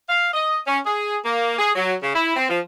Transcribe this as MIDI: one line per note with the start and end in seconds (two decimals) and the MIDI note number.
0.09 0.28 77
0.33 0.59 75
0.67 0.79 61
0.86 1.17 68
1.25 1.58 58
1.59 1.70 68
1.75 1.94 54
2.03 2.14 49
2.15 2.34 64
2.36 2.48 60
2.49 2.60 53